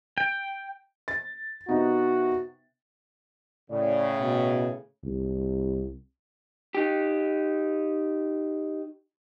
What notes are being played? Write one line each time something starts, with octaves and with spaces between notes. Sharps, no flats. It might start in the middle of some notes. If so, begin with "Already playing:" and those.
G5
A6
C3 B3 D#4 F#4
A2 C#3 D5
B2
C2
D#4 G4